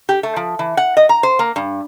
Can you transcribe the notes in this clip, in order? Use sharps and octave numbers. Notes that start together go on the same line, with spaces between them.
G4
A3
F3
E3
F#5
D#5
A#5
C5
A#3
G2